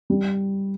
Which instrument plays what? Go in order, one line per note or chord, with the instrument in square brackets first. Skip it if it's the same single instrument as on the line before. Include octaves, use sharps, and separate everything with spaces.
[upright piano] G3